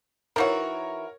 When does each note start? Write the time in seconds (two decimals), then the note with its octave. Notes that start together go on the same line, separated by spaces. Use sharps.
0.36 D#3 E3 F#4 A#4 C#5